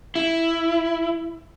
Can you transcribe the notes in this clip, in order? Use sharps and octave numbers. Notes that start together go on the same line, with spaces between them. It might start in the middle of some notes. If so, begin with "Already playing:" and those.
E4